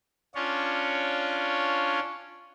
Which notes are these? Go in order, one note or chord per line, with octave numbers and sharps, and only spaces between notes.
C#4 D4 F4 C#5